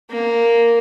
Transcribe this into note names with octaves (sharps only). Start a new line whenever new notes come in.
A#3